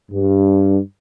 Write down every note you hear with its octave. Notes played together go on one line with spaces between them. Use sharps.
G2